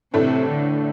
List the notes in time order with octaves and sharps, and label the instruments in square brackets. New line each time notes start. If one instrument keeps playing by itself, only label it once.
[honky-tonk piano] A2 E3 A3 D4 A4 [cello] C3
[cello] D3